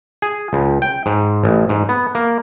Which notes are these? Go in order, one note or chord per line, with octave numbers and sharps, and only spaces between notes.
G#4
C#2
G5
G#2
A1
G#2
B3
A#3